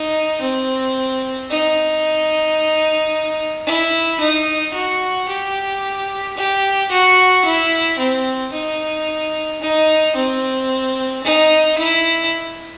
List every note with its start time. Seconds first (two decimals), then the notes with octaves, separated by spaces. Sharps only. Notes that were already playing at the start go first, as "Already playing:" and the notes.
Already playing: D#4
0.41 C4
1.50 D#4
3.67 E4
4.20 D#4
4.74 F#4
5.29 G4
6.37 G4
6.92 F#4
7.45 E4
7.99 C4
8.53 D#4
9.61 D#4
10.16 C4
11.24 D#4
11.78 E4